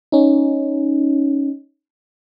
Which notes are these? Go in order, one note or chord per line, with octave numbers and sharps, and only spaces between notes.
C#4 D#4